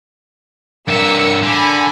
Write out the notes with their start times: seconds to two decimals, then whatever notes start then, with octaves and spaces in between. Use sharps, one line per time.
0.88 G2 A#3 E5 E6 C#7
1.43 D3 G#5 B5